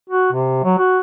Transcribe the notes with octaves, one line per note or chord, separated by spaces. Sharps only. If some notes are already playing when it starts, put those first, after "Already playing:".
F#4
C3
F#3
F#4